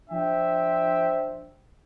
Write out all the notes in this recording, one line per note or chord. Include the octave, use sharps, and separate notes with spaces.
F3 D4 C5 E5 G5